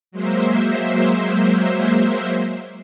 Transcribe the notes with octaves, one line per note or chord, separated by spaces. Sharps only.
F#3 G#3 A#3 C5 E5